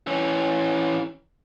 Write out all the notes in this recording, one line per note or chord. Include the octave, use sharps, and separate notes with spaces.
E3 C#4